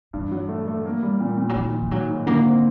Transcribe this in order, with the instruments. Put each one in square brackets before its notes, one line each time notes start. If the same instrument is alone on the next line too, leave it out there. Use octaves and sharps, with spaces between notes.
[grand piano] G2 [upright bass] E3
[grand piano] F#3
A3
A3
A#3
G3
A#2
A#2
[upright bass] F#3
[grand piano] D#3 [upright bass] F3
[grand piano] D#3
[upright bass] F3
[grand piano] G#2 [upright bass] F#3
[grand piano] G#2
[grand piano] D3 [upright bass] A#3
[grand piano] C4